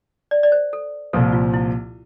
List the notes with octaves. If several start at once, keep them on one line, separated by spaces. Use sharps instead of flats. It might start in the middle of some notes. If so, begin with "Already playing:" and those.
D5
D5
C5
A4
C2 A#2 F3 A4
F4
E4